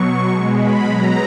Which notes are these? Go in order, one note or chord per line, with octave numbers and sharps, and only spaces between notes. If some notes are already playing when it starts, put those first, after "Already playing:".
Already playing: B2 F#3 C#6
B2 G#3
B5
B2 F#3 A#5